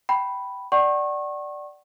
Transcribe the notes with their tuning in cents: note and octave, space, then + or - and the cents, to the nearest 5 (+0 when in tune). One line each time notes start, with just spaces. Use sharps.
G5 -20 B5 +0
D5 +5 F#5 +35 C#6 -30